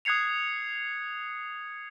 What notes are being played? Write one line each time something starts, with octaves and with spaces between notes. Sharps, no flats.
D#6 F#6 G#6 C7 C#7 F7